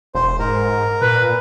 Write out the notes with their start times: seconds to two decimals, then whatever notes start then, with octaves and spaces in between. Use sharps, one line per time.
0.15 E1 C5
0.39 G#2 A#4
1.01 A#2 B4